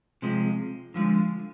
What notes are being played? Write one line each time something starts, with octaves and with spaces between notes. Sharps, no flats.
C3 F3 G#3
D3 F3 G#3